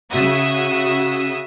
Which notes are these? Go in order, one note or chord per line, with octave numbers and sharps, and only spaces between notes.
C#3 F#4 E5 D#6